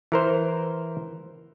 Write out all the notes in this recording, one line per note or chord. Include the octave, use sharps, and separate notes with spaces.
E3 A#4 C5